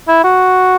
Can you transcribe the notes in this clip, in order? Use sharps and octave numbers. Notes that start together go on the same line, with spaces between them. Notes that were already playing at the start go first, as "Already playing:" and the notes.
E4
F#4